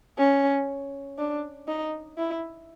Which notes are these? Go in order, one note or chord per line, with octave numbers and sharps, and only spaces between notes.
C#4
D4
D#4
E4